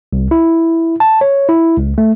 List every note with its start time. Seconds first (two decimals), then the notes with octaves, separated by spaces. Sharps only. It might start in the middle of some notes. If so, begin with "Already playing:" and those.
0.13 C2
0.31 E4
1.00 A5
1.21 C#5
1.49 E4
1.77 C#2
1.98 A3